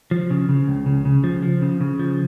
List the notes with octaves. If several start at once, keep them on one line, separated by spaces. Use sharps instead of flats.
F3
C#3
C#3
C#2
C#3
C#3
F3
F3
C#3
C#3
F3